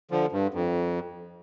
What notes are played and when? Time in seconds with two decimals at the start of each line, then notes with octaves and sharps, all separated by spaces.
0.11 D3 F3
0.32 G2
0.54 F2